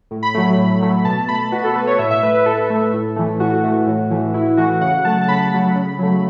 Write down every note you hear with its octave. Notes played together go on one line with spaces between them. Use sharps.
A2
B5
F#3 A3
A2
F#3 A3
B2 A5
A3 B5
B2 F#4
A4
A3 B4
C#5
A2 E5
E5
A3 B4
B4
A2 A4
A3
A2
E3 A3
A2 F#4
E3 A3
A2
E3 A3
A2 E4
E3 A3 F#4
C#3 F#5
F#3 A3 A5
A5
C#3 B5
F#3 A3
C#3
F#3 A3